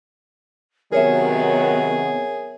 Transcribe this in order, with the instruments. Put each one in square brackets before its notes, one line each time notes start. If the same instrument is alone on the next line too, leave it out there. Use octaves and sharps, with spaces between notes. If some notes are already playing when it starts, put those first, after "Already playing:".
[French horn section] C3 D#3 F#3 [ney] B3 [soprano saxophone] G#4 [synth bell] A#4 C#5 E5